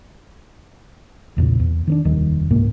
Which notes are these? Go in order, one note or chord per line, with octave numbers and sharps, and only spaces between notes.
B1 E2 A#2 C#3
E2
D#3 C4 D4
F1 D#2 D#3 G3
C#2 G#2 B2 A#3